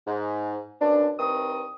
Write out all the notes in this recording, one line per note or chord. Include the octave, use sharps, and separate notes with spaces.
G#2
F#2 B2 D4
G2 D#3 C4 D#6